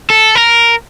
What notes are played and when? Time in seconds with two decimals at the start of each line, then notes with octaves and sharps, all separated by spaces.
0.10 A4
0.35 A#4